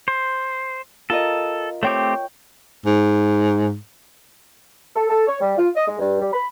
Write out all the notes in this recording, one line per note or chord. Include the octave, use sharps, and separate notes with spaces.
C5
F4 A4 A#4 D#5
A3 C4 G4 C#5 G5
G#2
A4
A4
C#5
G3
F4
D#5
G#3
G2
G3
B5